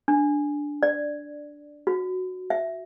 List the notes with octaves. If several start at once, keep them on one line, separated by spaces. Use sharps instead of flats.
D4
D5
F#4
E5